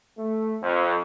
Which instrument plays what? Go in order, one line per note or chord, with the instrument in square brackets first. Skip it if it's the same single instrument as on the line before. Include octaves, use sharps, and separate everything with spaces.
[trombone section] A3
F2